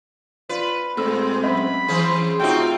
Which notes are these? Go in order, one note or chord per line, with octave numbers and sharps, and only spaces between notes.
F4 B4 D5
A#2 G#3 A3 C4 E6
F#2 D#5 E5 B5
E3 C#4 G#4 C5
C3 A3 C4 D#4 F4 F#4 C#5 G5